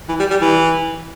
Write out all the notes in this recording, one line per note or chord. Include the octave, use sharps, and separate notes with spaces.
E3
G3
G3
E3